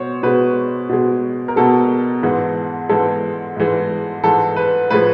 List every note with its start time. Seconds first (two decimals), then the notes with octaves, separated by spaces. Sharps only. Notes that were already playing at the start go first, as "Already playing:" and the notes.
Already playing: B2 C5 C#5
0.23 B2 G#3 B4
0.89 B2 G#3
1.48 A#4
1.56 B2 G#3 A4
2.23 G#2 E3 G#3
2.89 G#2 E3 G#3 A4
3.57 G#2 E3 G#3
4.24 G#2 E3 G#3 A4
4.56 B4
4.90 A2 F3 G#3 B4